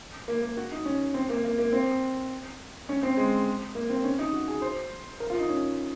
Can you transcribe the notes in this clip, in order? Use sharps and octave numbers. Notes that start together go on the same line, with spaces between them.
A#3
A#3
F#4
D#4
C#4
C4
A#3
A#3
A#3
C4
C#4
C4
G#3
A#3
C4
C#4
D#4
F#4
G#4
C5
A#4
F4
D#4
C#4